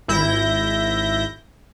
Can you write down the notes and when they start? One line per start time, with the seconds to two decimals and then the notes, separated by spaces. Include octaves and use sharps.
0.08 G#1 E4 G6 A#6